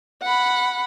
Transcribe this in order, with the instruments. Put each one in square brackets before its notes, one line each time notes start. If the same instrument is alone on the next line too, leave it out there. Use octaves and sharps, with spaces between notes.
[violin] F#5 B5